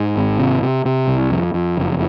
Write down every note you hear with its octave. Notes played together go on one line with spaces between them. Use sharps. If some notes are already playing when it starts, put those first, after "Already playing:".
Already playing: G#2
G#1
C3
C3
C3
C2
F2
F2
F#1